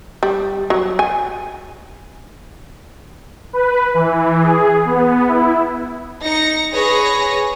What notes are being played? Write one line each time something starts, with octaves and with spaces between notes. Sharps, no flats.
G3
F#3
G#5
B4
E3
G#4
B3
E4
D#4 A#6 C#7
G#4 B4 C#5 C#6 A#6